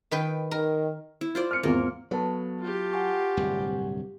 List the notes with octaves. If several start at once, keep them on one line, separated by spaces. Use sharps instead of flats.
D#3 B4 G5
D#3 A#4
E4
F4 C5 D5
F6 C#7
G#1 E2 A#3 F4 A#4
F#3 B3 A4 B4 A5
F4 G4
F#5 G#5 C#6
D1 C2 G2